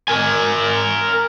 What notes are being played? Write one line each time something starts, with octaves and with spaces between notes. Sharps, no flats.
A#4 G#5